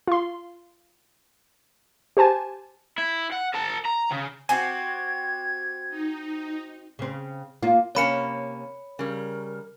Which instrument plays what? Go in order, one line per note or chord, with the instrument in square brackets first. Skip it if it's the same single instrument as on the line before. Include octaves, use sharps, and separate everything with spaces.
[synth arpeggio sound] F4 C6
G4 C5 G#5 A5
[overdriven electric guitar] E4
F#5
A#4 A5
A#5
C#3
[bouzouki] C4 F#4 G4 [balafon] G#5 [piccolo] G#6
[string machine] D#4
[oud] C#3 C4
A#3 F4
[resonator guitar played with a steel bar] C3 A#3 C#4 [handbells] C#5 B5 C#7
[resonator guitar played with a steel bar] C#3 G3 [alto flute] A#4